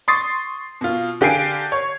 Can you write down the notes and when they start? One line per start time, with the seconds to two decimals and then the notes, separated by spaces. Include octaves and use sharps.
0.08 C6 C#6 D#6 A6 C7
0.81 B2 F4
1.21 D3 G4 F5 G#5 C7 D7
1.72 C#5